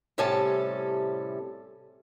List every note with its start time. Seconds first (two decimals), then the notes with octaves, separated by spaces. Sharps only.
0.18 A2 C3 G3 C#4 A4 A5